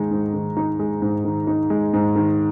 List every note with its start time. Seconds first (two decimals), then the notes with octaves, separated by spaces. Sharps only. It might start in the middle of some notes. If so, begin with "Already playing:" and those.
Already playing: G#2 D#3 G#3 D#4
0.11 G#2
0.34 D#3
0.57 D#4
0.79 G#3
1.02 G#2
1.25 D#3
1.47 D#4
1.70 G#3
1.93 G#2
2.16 D#3